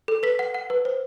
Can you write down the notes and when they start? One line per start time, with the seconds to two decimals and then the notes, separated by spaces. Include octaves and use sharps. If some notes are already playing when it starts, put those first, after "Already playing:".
0.08 A4
0.23 B4 B6
0.39 F#5
0.54 F#5
0.70 B4
0.85 C5